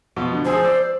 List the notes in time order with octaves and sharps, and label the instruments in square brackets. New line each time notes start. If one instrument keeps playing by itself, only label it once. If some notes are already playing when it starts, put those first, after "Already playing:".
[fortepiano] B2 F3
D3
[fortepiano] F3 G#4 E6 [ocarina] C5
[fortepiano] D5 E6